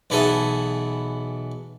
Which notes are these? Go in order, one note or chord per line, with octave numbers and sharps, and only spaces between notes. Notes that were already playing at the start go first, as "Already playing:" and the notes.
B1 E3 B3 G#4 A4 E5